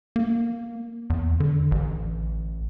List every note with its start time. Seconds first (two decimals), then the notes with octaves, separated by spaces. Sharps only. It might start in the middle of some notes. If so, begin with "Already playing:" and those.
0.16 A#3
1.10 E2
1.40 D3
1.71 A1